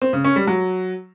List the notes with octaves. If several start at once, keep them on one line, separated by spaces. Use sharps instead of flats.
C4
C#3
C#4
G3
F#3